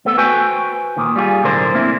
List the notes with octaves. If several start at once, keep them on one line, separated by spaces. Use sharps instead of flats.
A3 B3 A4
F#4 B4 C5 G5 G#5
A#2 D#3
G3 F4 F#4 G#4
B1 A2 D3 D4 A#4 C5
A#3 C4 E4